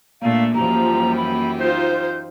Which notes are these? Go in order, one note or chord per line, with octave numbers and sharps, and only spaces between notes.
A#2 A3 A#3 D4 F5
F#2 E3 F3 G3 G4 A#5
B5
D#4 F4 C5 G6